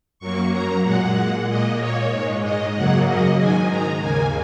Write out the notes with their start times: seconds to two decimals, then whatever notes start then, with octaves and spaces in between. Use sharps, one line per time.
0.19 F#2 F#3 A#3 C#6
0.52 A#5
0.83 A#2 G#3 F#5
1.47 A#2 A#3 D#5
1.79 C#5
2.10 G#2 G#3
2.42 D#5
2.74 F#2 C#3 F#3 A#3 F#5
3.07 D#5
3.38 G#2 D#3 G#3 G#5
3.70 A#5
4.01 D#2 C#3 A#3 G#5